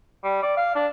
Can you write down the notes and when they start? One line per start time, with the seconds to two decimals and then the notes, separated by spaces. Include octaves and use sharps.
0.24 G3
0.43 D5
0.57 F5
0.75 D4